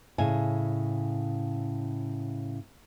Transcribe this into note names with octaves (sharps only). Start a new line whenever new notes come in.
A2 C#3 G#5